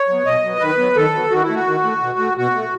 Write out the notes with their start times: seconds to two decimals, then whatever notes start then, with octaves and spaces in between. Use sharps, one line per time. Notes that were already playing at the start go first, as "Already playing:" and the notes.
Already playing: C#5
0.08 F#3 B3
0.26 B2 D#5
0.43 F#3 B3
0.60 D#3 B4
0.78 F#3 B3
0.96 D#3 A4
1.13 F#3 B3
1.31 D#3 F#4
1.43 E4
1.49 A3
1.55 F#4
1.66 D#3
1.84 A3
2.01 B2
2.19 A3
2.37 B2 F#4
2.55 A3